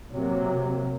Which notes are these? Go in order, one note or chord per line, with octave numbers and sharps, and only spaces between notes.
C3 F#3 A#3